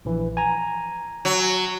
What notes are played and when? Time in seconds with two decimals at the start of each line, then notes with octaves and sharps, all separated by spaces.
0.05 A#1 E3
0.37 G#5 A#5
1.25 F#3